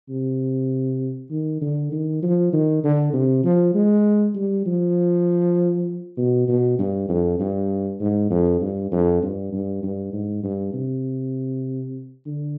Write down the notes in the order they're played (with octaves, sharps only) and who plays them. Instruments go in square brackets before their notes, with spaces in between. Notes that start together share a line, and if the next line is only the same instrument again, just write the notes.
[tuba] C3
D#3
D3
D#3
F3
D#3
D3
C3
F3
G#3
G3
F3
B2
B2
G2
F2
G2
G#2
F2
G2
F2
G2
G2
G2
G#2
G2
C3
D3